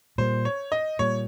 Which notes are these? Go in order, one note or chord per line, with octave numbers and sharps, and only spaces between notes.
A#2 G3 A#3 C5
C#5
D#5
A#2 G3 A#3 C#5